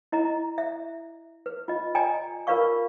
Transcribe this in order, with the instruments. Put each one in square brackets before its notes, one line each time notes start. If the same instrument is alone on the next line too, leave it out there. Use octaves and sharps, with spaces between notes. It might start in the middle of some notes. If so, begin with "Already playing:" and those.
[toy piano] E4 D#5 A#5
E5
B4
F4 D#5
D5 D#5 G5 G#5 A#5
F4 A#4 B4 D5 F5 C#6